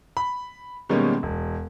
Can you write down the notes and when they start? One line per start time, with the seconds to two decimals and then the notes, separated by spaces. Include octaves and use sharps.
0.17 B5
0.89 B2 D#3 G3 G#3 A#3 C#4
1.23 E1